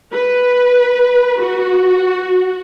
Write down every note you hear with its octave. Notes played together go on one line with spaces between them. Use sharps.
B4
F#4